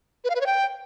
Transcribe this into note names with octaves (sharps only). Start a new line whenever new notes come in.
B4
F5
B4
C#5
G5